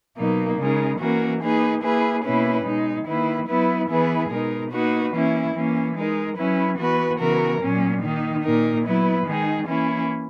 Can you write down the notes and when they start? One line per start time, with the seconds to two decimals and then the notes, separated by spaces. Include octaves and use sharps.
0.17 B2 F#3 A#3 D#4
0.58 C#3 G#3 D#4 A#4
0.99 E3 A#3 C#4 F#4 A#4
1.41 A#3 D#4 G#4 B4
1.82 A#3 E4 G#4 B4
2.24 B2 A#3 C#4 E4 B4
2.65 B2 G#3 D#4
3.06 D#3 A#3 E4 B4
3.48 F#3 B3 E4 B4
3.89 E3 B3 E4 G#4 B4
4.30 B2 G#3 D#4 A#4
4.72 A#3 D#4 F#4 B4
5.13 E3 A#3 C#4 E4
5.54 E3 A#3 C#4
5.96 G#3 D#4 A#4
6.37 F#3 C#4 E4 B4
6.79 E3 B3 F#4 B4
7.20 C#3 E3 B3 F#4 A#4
7.61 A#2 F#3 A#3 C#4
8.03 D#3 A#3 D#4
8.44 A#2 A#3 D#4 A#4
8.85 F#3 B3 E4 B4
9.26 D#3 G#3 D#4 G#4
9.68 E3 A#3 C#4 E4